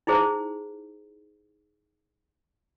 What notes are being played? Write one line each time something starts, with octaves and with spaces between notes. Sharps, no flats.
D#4 E4 G#4 C5